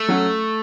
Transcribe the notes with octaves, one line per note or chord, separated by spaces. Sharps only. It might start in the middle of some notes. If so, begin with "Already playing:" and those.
Already playing: A3
F#3 C#4 F#4 A4